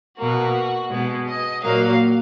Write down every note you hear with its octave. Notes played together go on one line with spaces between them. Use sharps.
B2 A#3 F#4
B2 G#3 B3
D#5
A#2 F#3 A#3 F5